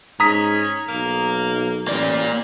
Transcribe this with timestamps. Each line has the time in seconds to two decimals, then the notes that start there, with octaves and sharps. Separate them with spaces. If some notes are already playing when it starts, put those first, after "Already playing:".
0.20 G#2 C#4 A#5 D#6 B6
0.89 B1 A#3
1.87 A1 G3 A#3 D5